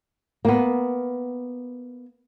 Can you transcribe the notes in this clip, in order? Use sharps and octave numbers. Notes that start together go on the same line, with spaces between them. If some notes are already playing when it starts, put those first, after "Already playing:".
A#3 B3